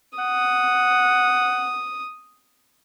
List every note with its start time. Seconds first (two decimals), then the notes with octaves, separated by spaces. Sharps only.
0.18 F#5 D#6